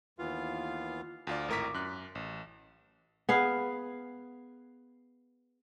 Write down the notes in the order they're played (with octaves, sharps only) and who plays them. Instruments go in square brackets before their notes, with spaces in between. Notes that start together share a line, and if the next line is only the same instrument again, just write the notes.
[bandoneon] D#2 E3 B3 F4 F5
[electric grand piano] D2 F4 D5
G#1 A2 A#4 D6 B6
F#2 F#6
A1
[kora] B3 G#4 F5